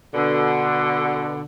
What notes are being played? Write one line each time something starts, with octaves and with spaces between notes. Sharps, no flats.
B2 D3